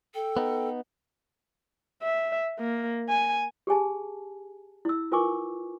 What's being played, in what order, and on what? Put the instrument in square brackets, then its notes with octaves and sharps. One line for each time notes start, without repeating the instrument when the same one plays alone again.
[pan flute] A4 [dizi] G5
[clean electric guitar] B3 D#4
[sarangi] E5
A#3
G#5
[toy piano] G4 G#4 G#5 A5
E4 E6
F4 A#4 B4 G#5 C#6 D6